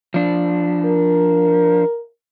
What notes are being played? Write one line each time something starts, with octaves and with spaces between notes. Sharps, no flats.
F3 D4
A#4